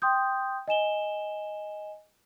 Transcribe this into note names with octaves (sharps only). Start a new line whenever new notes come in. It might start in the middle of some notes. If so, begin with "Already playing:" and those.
G5 C6 D#6 G6
D#5 G#5 E7 G7